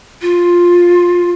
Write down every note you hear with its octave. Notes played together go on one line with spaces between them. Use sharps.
F4